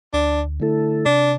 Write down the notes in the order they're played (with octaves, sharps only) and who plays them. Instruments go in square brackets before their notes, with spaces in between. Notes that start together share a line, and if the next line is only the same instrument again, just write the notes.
[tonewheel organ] D2 [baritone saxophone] D4
[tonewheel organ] D3 A3 E4 A4
[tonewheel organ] C3 [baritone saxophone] D4